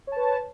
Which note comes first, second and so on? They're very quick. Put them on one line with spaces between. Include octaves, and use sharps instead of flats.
C#5 A5 B4